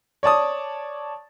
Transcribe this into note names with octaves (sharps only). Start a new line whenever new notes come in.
C#5 D5 A5 D#6